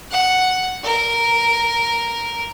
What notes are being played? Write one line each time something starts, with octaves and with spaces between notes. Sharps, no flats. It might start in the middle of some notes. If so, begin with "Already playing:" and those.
F#5
A#4